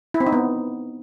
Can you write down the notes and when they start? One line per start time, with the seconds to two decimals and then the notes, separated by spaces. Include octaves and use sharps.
0.14 E4
0.20 C4
0.26 D#4
0.32 B3